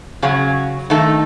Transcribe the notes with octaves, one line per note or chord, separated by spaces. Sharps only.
C#3 F#3 C#4 G#4
D#3 A3 D#4 A4